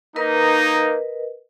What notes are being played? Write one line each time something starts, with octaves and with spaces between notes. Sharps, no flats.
A#3 D#4 A#4 B4 D#5